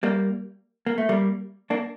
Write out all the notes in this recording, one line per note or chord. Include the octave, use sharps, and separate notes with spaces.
G3 A#3
A#3
A3
G3 A#3
A#3 D4